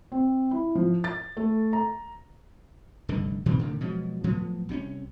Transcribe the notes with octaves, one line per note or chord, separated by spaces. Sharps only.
C4
E4
F3
A6
A3
A#5
F1 G2 D3 D#3
A#2 D#3 E3 C4
A2 D3 D#3
B2 F3 F#3 G#3
A2 F3 F#3 B3
C2 C3 C4 C#4